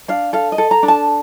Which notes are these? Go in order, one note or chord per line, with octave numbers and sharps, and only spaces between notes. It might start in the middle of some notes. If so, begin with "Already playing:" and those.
D4 F5
A4 F5
D#5
A4
A#5
D4
A5